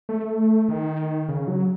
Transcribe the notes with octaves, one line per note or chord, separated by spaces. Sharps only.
A3
D#3
C#3
F#3